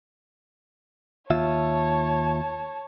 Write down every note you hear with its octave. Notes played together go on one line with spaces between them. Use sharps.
D#2 F4 C#5 E5 A5